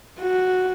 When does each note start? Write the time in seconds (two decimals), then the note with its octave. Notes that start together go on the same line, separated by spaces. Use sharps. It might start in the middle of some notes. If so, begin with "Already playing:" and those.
0.20 F#4